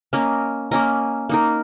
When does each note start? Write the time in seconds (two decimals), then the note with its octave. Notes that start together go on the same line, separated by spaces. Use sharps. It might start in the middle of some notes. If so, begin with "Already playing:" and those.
0.13 A#3 C#4 A#4 D#5
0.71 A#3 C#4 A#4 D#5
1.29 A#3 D#4 A#4